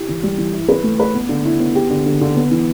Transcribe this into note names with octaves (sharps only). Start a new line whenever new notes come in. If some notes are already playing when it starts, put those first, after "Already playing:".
Already playing: E4 G4
E3
G3
E3
E4
B4
A3
B4
B3
D3
E4
B3
G4
D3
D3
D3
B3
E3